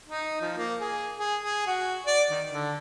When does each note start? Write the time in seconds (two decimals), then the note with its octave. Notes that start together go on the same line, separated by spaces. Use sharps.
0.09 D#4
0.42 F3
0.57 A#3
0.81 G#4
1.19 G#4
1.43 G#4
1.67 F#4
2.07 D5
2.30 D#3
2.51 D3